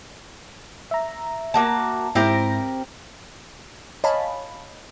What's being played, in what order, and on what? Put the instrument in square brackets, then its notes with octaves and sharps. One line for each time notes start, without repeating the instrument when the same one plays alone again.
[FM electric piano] E5 A#5
[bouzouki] A#3 F#4 A5
[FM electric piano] G#2 E4 A#6 [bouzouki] C4 G4 A#4
[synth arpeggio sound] C#5 D#5 F5 G#5 A5 B5